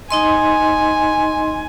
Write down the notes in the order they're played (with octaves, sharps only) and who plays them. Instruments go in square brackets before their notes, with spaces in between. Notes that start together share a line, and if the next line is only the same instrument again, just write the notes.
[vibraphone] D#4 D#5 C6 [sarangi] G#5